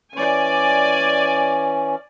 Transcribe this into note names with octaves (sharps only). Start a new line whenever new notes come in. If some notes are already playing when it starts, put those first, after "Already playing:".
E3 C#4 D5 G#5